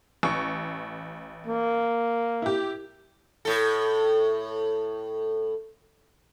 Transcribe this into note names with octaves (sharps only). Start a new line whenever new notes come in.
A1 C#6
A#3
E4 G4
A2 A4